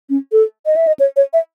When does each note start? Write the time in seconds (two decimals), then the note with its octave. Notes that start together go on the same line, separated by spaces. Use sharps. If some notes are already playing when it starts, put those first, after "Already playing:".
0.10 C#4
0.32 A4
0.66 D#5
0.76 E5
0.87 D#5
1.00 C#5
1.16 C#5
1.33 E5